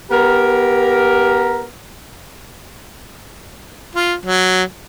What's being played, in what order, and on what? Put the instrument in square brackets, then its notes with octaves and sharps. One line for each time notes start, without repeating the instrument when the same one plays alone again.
[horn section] B3 G4 A#4
[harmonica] F4
F#3